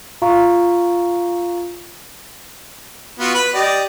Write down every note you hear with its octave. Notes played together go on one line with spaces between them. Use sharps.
F4 F5 A#5 C#6
B3 F4 F#4
B4 B5
G4 D5 D#5